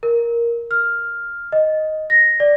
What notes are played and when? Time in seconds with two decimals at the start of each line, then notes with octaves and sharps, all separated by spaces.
0.03 A#4
0.71 F6
1.52 D#5
2.10 A#6
2.40 D5